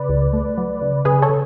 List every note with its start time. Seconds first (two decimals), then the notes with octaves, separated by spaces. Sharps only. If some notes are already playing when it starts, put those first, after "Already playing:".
Already playing: C#3 B4 D5
0.09 C#2
0.33 A3
0.58 F#3
0.82 C#3
1.05 C#3 G#4 B4
1.22 A4 C#5
1.29 C#3